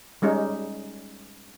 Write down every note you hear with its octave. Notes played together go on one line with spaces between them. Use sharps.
G3 G#3 C#4 D#4